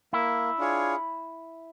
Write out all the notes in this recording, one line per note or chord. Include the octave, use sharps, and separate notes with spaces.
A#3 E4
D4 F4 G#4 C#5